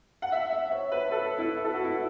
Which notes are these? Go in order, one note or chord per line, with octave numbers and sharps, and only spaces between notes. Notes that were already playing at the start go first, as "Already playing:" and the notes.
F#5
E5
E5
C#5
B4
A4
E4
A4
F#4
E4